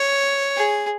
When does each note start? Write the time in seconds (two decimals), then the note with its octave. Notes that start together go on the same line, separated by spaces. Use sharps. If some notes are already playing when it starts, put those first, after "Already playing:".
Already playing: C#5
0.56 G#4